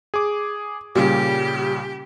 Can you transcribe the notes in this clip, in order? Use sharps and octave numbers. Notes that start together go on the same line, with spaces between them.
G#4 D6
A#2 C#3 G3 G4